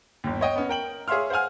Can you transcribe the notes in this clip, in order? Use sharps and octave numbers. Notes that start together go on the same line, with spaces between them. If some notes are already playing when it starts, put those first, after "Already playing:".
G1 D#2
C#5 D#5 G5
B3 C#4
A#4 G5 F#7
G#4 C#5 E5 F5 C6 F6
C5 F5 F#5 G#5 F6